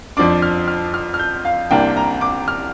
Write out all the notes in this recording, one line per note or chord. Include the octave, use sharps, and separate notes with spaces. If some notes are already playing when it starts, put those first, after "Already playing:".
F2 F3 D4 D6
F6
F6
F6
F6
G6
F5
C2 C3 A#3 D4 G5
A#5
D6
F6